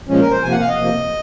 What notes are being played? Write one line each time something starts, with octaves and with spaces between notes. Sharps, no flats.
A#2 F3 G#3 C#4
A#4
C5
C3 F3 A#3 G#5
F#5
F5
D#5
C3 F3 A#3